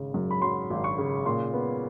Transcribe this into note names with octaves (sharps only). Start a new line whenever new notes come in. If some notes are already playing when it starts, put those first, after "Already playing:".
Already playing: G#1 C#3
F#2
B5
F#3 C6
G#1
C#6
C#3
A#2 C6
B3